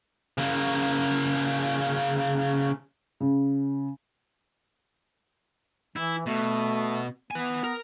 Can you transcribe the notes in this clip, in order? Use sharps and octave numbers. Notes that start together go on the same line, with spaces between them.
C#3 A#3
C#3
E3 E4
B2 A3
B3 B4 G#5
A#4